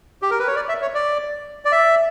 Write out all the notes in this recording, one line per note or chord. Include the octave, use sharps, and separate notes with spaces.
G4
A#4
B4
C#5
D5
E5
C#5
D5
D5
E5